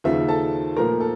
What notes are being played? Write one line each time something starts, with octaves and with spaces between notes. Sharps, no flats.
D#2 C#3 F3 E5
A4 A5
A#2 F3 A3 A#4 A#5
A4